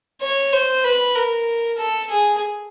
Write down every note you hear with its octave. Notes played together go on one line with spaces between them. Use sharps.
C#5
C5
B4
A#4
A4
G#4